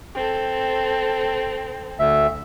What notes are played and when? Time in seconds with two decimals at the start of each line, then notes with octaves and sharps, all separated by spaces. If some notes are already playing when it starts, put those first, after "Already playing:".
0.15 C4 A4
1.99 D2 E5